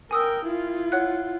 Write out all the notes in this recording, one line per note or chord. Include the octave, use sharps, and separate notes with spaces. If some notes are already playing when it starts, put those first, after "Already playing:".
A#4 G5 G#5 D#6 E6
E4 F4
C#5 F#5 F#6